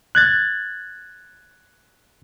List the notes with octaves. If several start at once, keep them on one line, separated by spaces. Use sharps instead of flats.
F#6 G#6 A6